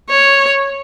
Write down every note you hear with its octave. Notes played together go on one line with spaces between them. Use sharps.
C#5